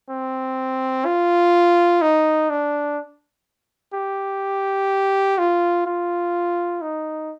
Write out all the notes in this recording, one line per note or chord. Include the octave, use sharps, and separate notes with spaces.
C4
F4
D#4
D4
G4
F4
F4
D#4